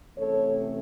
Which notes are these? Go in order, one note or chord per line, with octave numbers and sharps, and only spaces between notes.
C3 E3 A3 C#4 A4 C#5